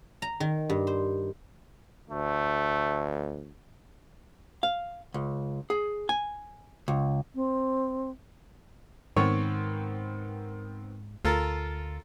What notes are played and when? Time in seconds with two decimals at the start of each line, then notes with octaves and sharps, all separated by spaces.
0.22 A#5
0.40 D#3
0.70 G2
0.87 C5
2.10 D2 A3
4.63 F5
5.14 C#2
5.70 G#4
6.09 G#5
6.88 C#2
7.35 C4
9.16 G#2 D#3 B3 C4 C#5
11.25 D2 F4 A4 A#4